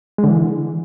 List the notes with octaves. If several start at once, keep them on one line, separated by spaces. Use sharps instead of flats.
G#3
D3
E3